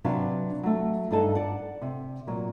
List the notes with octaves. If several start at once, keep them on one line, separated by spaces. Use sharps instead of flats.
C3 F#3 D4 B4 F5
F#3 A3
G2 D4 D#4 A4 G#5 A5
D5 F#5
C3
A#2 F#3